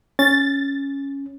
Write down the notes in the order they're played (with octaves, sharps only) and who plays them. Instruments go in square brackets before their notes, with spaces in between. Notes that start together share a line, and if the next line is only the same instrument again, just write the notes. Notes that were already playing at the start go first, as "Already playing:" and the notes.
[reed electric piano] C#4 [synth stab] A6